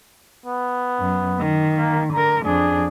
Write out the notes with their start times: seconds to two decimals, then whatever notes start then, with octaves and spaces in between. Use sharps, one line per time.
0.46 B3
0.99 F#2
1.40 D#3
1.78 A#3
2.13 D3 A#4 A#5
2.45 F2 D4 G#4